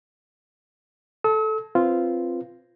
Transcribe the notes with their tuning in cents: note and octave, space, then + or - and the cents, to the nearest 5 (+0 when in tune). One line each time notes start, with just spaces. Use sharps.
A4 -10 E6 -45
C4 +5 F4 -10 B4 +0